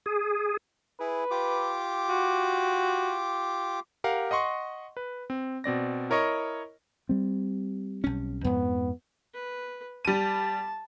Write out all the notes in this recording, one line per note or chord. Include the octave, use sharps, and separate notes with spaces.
G#4
E4 G#4 B4
F4 G4 D6
F#4
G4 A#4 F5 F#5
D#5 F#5 C6 C#6
B4
C4
B2 C4 D5 A#6
E4 A#4 C#5 D#5 C#6
G3 C4
B1 C#4
F2 G#2 B3
B4
G3 A5 D#7